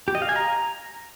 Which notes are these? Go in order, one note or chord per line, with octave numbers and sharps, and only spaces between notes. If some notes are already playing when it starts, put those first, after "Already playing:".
G4
D#5
F5
G#5
A#5